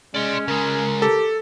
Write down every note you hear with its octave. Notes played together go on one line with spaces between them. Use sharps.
G#3 C#4 D5 C6
C#3 G#3 A#4
G4 A4